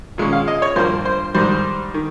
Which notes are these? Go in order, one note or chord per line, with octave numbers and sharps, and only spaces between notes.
A#2 G#3 C#4
F5
D#5
C#5
G2 F3 A#3 C5
C5
G#2 D#3 G3 C5
D#3